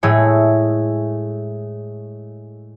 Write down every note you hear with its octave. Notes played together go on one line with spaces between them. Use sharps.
A2 G#3 A3 G#4 C#5